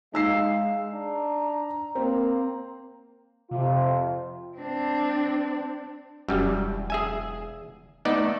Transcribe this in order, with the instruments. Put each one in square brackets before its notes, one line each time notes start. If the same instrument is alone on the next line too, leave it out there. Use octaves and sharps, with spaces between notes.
[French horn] G#3 [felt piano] D#4 E6 C7 [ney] F5
[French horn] D4 [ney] A#5
[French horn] A#3 [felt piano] C4
[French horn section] F2 F4 [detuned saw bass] C3
[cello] C4 D4
[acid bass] E1 [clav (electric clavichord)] F#2 G3
[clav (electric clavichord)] G#4 E5 G#5
[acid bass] A3 [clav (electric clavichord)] B3 D#4 D5